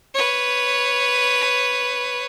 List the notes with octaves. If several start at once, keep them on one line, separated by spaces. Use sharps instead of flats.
B4 C#5